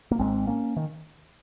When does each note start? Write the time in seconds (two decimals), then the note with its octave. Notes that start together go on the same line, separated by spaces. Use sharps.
0.11 A#3
0.19 G#1 G#2 G#3 C4
0.47 A#3 C#4
0.77 D#3